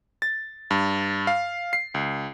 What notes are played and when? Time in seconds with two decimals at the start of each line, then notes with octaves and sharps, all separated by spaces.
0.22 A6
0.71 G2
1.27 F5
1.73 C7
1.94 C#2